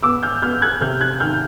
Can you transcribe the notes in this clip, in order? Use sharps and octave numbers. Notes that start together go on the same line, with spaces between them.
B3 D6 E6
F6 G6
B3 F6 G6
F#6 G#6
C3 F6 G6
F#6 G#6
D#3 F6 G6